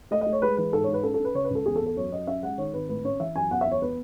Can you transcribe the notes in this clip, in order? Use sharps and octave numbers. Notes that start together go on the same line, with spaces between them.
A3 D#5
D#5
A3
C#5
G#3 B4
E3 B4
G#2 A4
G#2 C#5
B4
C#4 A4
A4
C#4 B4
C#3 C#5
B4
C#2
A4
E2 G#4
A4
E2
A4
F#2 C#5
F#2 D#5
C#4 E5
G#3 F#5
D#3 C#5
G#1 B4
A2 B4
C#4 C#5
E3 E5
F#2 G#5
E2 F#5
E5
E2
C#5
B3 B4